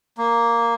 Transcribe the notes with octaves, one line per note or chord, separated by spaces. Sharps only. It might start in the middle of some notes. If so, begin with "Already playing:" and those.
A#3